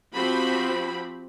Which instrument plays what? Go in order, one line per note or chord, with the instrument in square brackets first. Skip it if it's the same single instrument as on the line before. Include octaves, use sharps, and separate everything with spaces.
[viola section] F3 C4 F#4 G4 B5